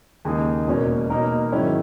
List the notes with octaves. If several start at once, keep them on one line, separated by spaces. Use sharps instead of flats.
D#2 C#3 G#3 D#4 G#4
E1 E2 B2 A#3 C#4
B2 A#3 D#4 A#4
G#2 D#3 F#3 C#4 E4